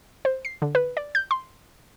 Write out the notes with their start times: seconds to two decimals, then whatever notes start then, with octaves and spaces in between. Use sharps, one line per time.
0.25 C5
0.45 C7
0.62 D3
0.75 B4
0.97 D5
1.15 G6
1.31 C6